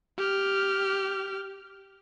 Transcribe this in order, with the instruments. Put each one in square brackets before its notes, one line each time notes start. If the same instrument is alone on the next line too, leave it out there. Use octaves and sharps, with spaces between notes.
[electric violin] G4 F6